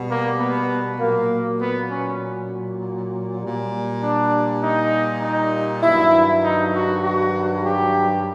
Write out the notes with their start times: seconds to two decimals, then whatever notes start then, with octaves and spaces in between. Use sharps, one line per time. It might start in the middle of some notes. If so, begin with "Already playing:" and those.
Already playing: B2 G3
0.09 A#3
0.39 B3
0.99 A#2 F#3 A#3
1.60 B3
1.90 C#4
3.41 A#2 G3
4.01 D4
4.63 D#4
5.22 D#4
5.83 G2 D#3 F#3 E4
6.43 D#4
6.74 F#4
7.04 F#4
7.64 G4